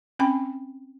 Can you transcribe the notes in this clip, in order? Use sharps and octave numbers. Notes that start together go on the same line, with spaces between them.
C4 C#4 G5 B5